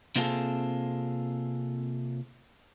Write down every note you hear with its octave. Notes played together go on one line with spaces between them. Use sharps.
C3 A#3 C4 F4 G#4 A4